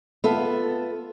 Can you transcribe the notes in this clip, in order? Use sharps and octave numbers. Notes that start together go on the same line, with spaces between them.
B3 F4 A4 E5